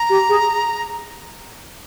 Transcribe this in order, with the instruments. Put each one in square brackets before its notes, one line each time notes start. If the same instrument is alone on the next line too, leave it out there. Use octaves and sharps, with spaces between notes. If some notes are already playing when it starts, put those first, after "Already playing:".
Already playing: [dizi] A#5
[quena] G4
G#4